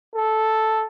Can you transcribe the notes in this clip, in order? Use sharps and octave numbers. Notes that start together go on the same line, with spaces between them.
A4